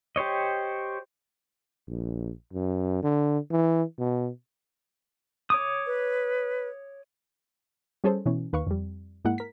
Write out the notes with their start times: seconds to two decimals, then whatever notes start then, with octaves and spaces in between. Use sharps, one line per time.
0.16 G4 C5 C#5 D#5
1.88 A#1
2.53 F#2
3.03 D3
3.51 E3
3.99 B2
5.50 C#5 D6 D#6
5.86 B4
8.04 G3 C#4 G#4 A4 C5
8.26 B2 E3 C#4
8.53 D#2 B4 F5 C#6
8.67 F2 G3
9.25 G#2 G#3 A#3 E4 F#5
9.38 A#4 B6